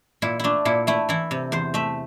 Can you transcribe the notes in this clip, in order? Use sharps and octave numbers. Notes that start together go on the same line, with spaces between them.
A#2 E4
A3 D4 E4
A#2 E4
A3 E4
E3 E4
C3
E2 C5
A3 E5